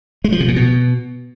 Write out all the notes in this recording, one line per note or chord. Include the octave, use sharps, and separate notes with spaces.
G#3
F3
C3
A#2
B2